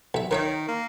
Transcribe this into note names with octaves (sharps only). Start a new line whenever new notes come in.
B1 E5
D#3 A#4 C#5 E5
A#3